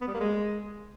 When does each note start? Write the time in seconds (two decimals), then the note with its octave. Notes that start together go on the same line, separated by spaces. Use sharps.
0.01 B3
0.08 G3
0.14 A#3
0.20 G#3